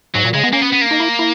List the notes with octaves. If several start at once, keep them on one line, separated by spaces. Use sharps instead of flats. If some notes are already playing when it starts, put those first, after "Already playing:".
G#2 F#3
A#2
C#3 G#3
B3
A#3 C#4
B3
B3
A#3
D#4
E4
E4